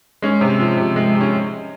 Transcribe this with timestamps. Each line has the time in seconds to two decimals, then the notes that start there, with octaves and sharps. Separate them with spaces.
0.22 G#3 C#4
0.41 C3
0.60 F3
0.77 C3
0.96 G#3
1.15 C3
1.21 C#4